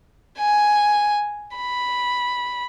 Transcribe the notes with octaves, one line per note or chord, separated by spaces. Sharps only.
G#5
B5